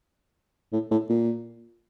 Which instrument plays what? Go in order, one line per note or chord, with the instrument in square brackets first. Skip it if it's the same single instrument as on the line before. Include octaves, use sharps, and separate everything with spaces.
[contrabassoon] A2
A2
A#2